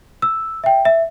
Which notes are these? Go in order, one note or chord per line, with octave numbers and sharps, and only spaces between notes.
E6
E5 G5
E5